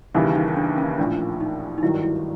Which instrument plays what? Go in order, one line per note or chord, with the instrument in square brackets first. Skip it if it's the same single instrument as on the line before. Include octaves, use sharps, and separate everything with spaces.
[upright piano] D#2 C#3 E3 G3 [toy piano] D#4
[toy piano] D#4
D4
C#4
[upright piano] A#1 A2 F3 [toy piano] D4
[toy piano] D#4
D#4
[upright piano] G#1 G2 D#3 F#3 [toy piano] E4
[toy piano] E4